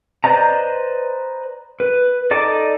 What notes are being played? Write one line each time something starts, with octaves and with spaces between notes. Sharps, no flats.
B4 C5 D5 D#5 A#5
B4
D#4 A4 D5 D#5 D6